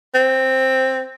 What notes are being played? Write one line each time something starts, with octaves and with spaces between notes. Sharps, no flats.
C4